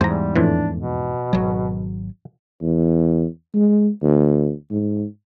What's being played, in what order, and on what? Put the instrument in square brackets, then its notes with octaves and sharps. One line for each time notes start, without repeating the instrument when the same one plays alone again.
[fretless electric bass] E2 G#2 [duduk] G3 [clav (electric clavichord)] C5 A#5
[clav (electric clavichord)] F2 A2 E3 [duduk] D4
[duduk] B2
[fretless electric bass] G#1 F#3
[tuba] E2
G#3
D2
G#2